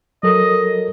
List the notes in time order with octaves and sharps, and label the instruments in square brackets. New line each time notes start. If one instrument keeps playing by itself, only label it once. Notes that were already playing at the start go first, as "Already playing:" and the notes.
[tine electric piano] F#3 A4 A#4 [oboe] D#5